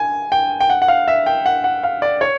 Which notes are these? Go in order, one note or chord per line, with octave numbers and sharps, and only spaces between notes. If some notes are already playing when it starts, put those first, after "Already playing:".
Already playing: G#5
G5
G5
F#5
F#5
F5
E5
G5
F#5
F#5
F5
D5
C#5